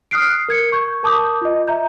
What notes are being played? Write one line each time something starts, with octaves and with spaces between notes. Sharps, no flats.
D#6 F6 F#6 C7 D7
A#4 G#6 C#7
C#6 G6 G#6
A#4 A5 D6 D#6 G6
F4 D#5
E5 A#5 G6